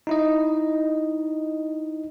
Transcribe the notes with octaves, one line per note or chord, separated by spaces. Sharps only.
D#4 E4 D#5